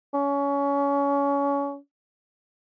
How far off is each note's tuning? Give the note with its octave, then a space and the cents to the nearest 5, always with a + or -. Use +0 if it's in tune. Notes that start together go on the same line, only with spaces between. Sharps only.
C#4 +25